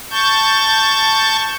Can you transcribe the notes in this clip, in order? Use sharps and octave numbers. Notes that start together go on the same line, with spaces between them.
A5 C#6 G6